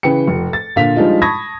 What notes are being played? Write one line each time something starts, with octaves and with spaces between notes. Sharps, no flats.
C#3 E3 B4 G5 C#7
F1
A6
A#2 D3 F4 F5 B6 F7
F3 G3 G#3 D4 D#4 F4
A5 B5 C#6 D#6 G#6 A#6